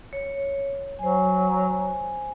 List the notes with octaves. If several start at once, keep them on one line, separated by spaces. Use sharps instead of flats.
C#5
F#3 C5 G#5